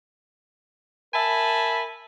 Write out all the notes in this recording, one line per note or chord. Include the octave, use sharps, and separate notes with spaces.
A#4 E5 G#5 A5 B5